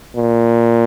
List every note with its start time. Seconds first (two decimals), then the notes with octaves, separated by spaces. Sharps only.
0.16 A#2